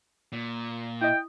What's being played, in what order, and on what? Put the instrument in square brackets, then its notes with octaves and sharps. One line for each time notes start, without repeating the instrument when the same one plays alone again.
[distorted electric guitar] A#2
[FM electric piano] E4 D#5 [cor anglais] G5